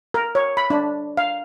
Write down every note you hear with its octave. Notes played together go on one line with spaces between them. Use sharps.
A#4
C#5
B5
D4
F5